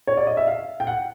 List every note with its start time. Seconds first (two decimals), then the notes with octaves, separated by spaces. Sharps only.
0.07 C#5
0.17 D5
0.27 D#5
0.37 E5
0.47 F5
0.80 G5
0.87 F#5